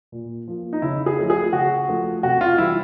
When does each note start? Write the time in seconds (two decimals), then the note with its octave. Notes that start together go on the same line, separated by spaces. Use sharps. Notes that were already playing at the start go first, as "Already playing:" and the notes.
0.12 A#2
0.48 F3 A#3
0.73 D#4
0.82 C#3 E4
1.06 G#4
1.18 F3 A3 C#4
1.30 G#4
1.53 C#3 F#4
1.88 F3 A3
2.23 C3 F#4
2.41 F4
2.58 E3 G3 E4